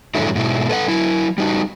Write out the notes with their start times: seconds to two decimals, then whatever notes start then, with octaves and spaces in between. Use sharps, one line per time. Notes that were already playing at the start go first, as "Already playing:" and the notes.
0.15 F2 G#2 D3 F#3 E4
0.35 G#2 B2 E4
0.69 A4 B4 D#5 F#5
0.88 F#3 E4
1.38 G3 D#4 F#4